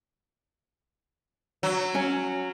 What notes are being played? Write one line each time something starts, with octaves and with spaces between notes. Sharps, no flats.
F#3
C#4 G#5